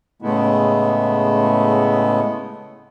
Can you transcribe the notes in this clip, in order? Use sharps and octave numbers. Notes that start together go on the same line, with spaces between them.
A2 C#3 G#3 A3 B3 E4